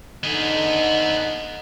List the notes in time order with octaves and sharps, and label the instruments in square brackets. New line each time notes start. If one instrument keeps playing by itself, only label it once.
[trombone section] D3 D#4 [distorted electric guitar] B3 G#4